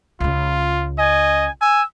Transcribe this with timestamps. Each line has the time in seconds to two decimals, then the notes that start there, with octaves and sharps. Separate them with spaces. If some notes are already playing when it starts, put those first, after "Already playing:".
0.20 C#2 C#3 F4
0.98 D#5 G#5
1.61 G#5 E6